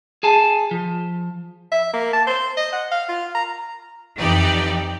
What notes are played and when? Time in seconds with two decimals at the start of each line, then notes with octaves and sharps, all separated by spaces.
0.23 G#4 G#5 A5
0.71 F3
1.72 E5
1.94 A#3
2.13 A5
2.27 C5
2.57 D#5
2.72 F#5
2.92 F5
3.09 F4
3.35 A#5
4.18 F2 E3 D#4 G4 D5